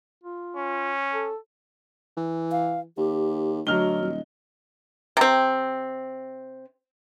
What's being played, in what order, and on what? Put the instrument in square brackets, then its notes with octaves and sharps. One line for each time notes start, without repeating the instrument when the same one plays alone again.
[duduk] F4
[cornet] C#4
[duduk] A4
[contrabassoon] E3
[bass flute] F5
[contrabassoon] D#2 [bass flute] G4
[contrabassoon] D2 [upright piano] F#3 F6 G7 [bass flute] D#5
[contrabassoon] D#1
[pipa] C3 C4